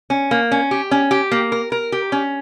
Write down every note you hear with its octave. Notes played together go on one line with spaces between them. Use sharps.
C#4
A#3
C#4
G4
C#4
G4
A#3
A#4
A#4
G4
C#4